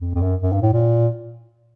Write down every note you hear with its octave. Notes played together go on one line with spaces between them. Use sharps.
F2
F2
F#2
F#2
G2
A2
A#2